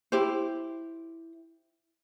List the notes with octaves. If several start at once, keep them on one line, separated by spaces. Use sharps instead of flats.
E4 G4 C5